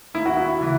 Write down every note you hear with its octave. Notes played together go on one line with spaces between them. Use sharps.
D#2 E4
F#4
E4
C#3 E3